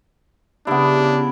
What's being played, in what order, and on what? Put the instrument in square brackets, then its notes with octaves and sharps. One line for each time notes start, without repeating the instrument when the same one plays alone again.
[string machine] C#3 [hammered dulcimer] B3 E4 [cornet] D4 [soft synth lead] G4